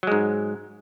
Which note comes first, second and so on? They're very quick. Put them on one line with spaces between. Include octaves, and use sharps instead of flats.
F#3 G#3 G#2